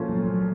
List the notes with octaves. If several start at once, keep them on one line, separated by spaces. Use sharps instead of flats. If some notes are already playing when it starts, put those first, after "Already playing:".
Already playing: A#2 F3 A3 C#4 F4
F#3
F#3